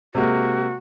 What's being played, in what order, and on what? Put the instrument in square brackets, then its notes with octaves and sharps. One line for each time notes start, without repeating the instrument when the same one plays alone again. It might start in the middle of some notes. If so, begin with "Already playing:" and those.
[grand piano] C3 G#3 A#3 [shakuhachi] F#4